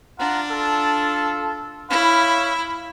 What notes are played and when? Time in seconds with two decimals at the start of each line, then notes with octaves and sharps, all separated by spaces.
0.19 D4 F4 F#5 A#5
0.51 F4 A4
1.90 E4 C#5 F5 B5